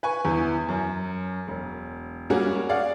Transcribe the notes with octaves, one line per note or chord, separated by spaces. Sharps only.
B4 G#5 C#6
E2 E3
F#2
E1
G3 G#3 A#3 C#4 F#4 G#4
G#4 D5 F5 F#5